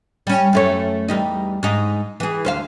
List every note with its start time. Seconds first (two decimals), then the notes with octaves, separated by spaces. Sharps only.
0.27 G3 C#4
0.53 F#2 A3 C#5
1.08 E2 G3 D#4
1.63 G#2 D#4
2.20 E3 G#4
2.45 D2 C5 F5